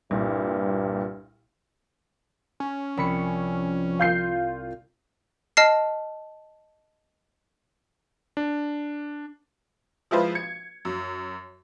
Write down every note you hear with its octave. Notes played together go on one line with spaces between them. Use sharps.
C2 G2 A#2
C#4
C2 F3 B5 C#7
F4 G6 C7
D#5 A5 F6 C7
D4
F3 G#3 E4 F4 B4 C5
G#6 C#7
F#2